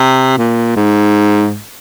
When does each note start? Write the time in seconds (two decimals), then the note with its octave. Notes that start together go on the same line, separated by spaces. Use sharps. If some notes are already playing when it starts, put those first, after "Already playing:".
Already playing: C3
0.38 A#2
0.76 G#2